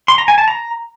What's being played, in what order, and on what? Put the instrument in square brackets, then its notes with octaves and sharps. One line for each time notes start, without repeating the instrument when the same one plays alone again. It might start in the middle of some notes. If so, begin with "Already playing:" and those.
[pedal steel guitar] C6
A#5
G#5
A5
A#5